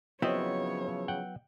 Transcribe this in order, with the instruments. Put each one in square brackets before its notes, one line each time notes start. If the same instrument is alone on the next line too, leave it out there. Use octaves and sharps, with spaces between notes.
[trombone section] C#3 F3 [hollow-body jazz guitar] F#3 B3 E4 [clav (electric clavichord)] C4 D#5 [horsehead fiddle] C#5
[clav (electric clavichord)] F#5 G5